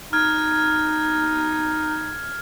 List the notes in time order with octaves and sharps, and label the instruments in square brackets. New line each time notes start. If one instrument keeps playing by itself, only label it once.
[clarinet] D#4 [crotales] F6 G#6